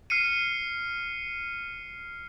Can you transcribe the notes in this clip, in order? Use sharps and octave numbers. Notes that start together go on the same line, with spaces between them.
F6 C7 C#7 D#7